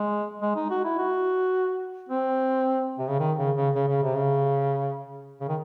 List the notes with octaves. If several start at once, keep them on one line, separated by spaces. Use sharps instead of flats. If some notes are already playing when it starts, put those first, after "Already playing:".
Already playing: G#3
G#3
D#4
F#4
E4
F#4
C4
C3
C#3
D#3
C#3
C#3
C#3
C#3
C3
C#3
C#3
D#3